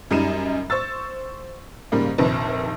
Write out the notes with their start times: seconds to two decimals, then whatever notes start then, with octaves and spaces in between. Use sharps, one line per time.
0.11 F#2 G3 D#4 D#7 E7
0.70 C5 C#6 E6 A6
1.92 G#2 C#3 G3 A#3
2.18 F1 A#1 C3 D#3 B4 A5